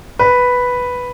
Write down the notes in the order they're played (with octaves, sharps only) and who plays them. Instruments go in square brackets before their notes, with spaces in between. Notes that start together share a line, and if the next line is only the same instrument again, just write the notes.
[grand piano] B4